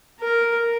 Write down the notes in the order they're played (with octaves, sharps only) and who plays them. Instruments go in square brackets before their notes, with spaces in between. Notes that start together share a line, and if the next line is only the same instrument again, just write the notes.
[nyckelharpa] A#4